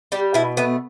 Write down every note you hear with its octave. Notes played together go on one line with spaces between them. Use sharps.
G3 G4
B2 E4
A3 B3